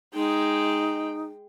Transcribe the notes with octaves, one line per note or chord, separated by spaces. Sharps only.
G#3 D#4 G5